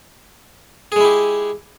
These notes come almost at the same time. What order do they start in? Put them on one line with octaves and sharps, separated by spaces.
G#4 G#3 E4 G4